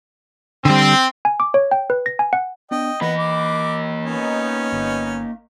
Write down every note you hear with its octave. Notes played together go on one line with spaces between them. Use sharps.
D3 G3 C4
G#5
D6
C#5
G5
B4
A#6
G#5
F#5
B3 D4 D#5 G5
E3 A#3 B3 D#5 B5
D6
B3 C#4 D#4
G1